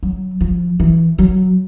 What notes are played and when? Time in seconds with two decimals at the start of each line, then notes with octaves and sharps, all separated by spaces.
0.03 F#3
0.41 F3
0.80 E3
1.18 F#3